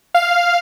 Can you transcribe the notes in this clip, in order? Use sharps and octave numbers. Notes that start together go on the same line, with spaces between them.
F5